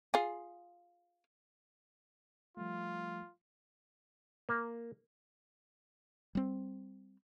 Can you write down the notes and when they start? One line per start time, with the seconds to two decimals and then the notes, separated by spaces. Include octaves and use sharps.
0.14 F4 G#4
2.57 F3 G3 A3 F4
4.49 A#3
6.35 G3 C4